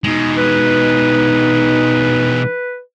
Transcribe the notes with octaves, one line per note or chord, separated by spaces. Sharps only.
B2 G#3 D#4
B4